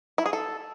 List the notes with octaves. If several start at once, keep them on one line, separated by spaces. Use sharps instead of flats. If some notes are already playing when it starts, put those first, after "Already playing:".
E4
G#4
A4